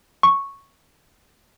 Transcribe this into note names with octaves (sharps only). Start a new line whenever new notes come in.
C#6